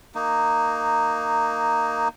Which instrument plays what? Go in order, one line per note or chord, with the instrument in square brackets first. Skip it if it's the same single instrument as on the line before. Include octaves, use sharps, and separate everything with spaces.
[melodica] A#3 D#4